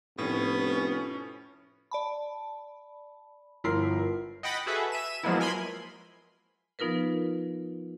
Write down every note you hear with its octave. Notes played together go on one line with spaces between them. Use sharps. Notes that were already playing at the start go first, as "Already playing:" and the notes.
F1 A2 B3 C#4
D5 A5 B5
G1 F3 E4 A#4 C6 C7
D#5 F#5 G5 B5 A6 B6
F#4 G#4 A4 B4 E5
E5 D#7 E7
F3 F#3 G#3 A#3 B3 E4
A#4 G#5 B5 C6
F3 B3 D#4 F4 A#4 B4